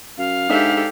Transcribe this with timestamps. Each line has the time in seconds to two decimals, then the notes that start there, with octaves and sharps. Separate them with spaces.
0.18 F#2 F5
0.49 G#2 D4 G4 A4 E5